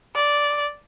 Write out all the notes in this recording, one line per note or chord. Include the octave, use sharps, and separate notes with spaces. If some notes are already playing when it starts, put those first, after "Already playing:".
D5